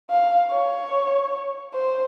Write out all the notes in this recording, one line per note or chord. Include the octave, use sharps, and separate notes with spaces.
F5
C#5
C5